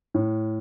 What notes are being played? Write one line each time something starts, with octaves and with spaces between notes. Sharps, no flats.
A2